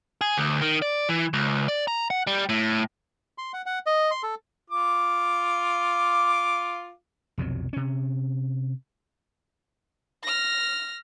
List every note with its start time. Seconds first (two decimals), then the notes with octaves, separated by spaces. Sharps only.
0.21 G#4
0.38 D2
0.61 D#3
0.82 D5
1.09 E3
1.33 C#2
1.68 D5
1.88 A#5
2.10 F#5
2.27 G3
2.49 A2
3.38 C6
3.53 F#5
3.66 F#5
3.86 D#5
4.11 C6
4.23 A4
4.70 F4 D6
7.38 B1 F2 C3 F#3
7.73 C3 C#4
10.23 F6 A#6